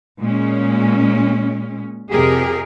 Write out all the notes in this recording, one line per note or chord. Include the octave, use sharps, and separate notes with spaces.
A#2 G#3 C#4
F2 C3 G4 G#4 A#4